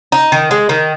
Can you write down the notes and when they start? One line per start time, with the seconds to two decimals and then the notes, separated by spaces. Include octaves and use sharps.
0.12 D#4
0.32 D#3
0.51 G#3
0.69 D#3